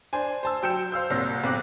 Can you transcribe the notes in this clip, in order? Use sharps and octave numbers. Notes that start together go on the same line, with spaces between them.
D4 C5 G#5
C5 A5 E6
F#3 G5 G6 C#7 E7
C5 F5 E6 G6
C2 A#2 C#5 A#6
B1 C4 D6 F#6